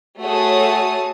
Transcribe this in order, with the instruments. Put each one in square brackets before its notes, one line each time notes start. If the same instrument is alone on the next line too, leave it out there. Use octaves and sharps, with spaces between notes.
[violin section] A3 F#4 G#4 C#5 A5 D#6